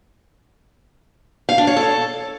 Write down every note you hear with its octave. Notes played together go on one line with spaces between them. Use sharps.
F5
D4
C#5
A4